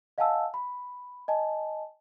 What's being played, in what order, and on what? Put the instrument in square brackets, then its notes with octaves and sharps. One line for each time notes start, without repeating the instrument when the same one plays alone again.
[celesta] D#5 F5 F#5 G#5 A5 E6
B5
D#5 G#5 A5